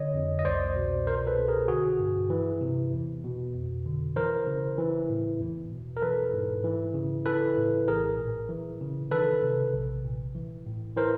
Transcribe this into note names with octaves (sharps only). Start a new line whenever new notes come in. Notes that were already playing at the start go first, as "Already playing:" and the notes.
Already playing: D3 C#5 D#5
F2
D#5
C2 C5 D5
B2
C2 A#4 C5
A4 B4
B2
G#4 A#4
D3 F#4 G#4
G2
E3
C3
E2
B2
F2
D3
E3 A#4 C5
C#3
E3
A2
E2
B2
A#4
E3 A4 B4
G#2
E3
C#3
E3 A4 B4
A2
A#1 G#4 A#4
A#2
E3
C#3
D#3 A4 B4
C3
A#1
A#2
E3
A2
E3 A#4 C5